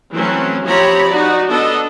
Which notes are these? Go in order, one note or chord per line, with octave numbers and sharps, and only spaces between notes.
E3 F#3 A3 C4 C#4
F3 C4 G4 C#5 A#5 B5
D#4 F#4 D5
B3 D4 A4 D#5